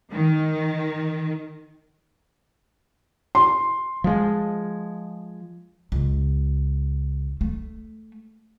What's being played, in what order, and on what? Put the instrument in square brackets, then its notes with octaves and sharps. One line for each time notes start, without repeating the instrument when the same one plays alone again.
[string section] D#3
[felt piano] C6
[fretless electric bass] F3 G#3
[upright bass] C#2
A3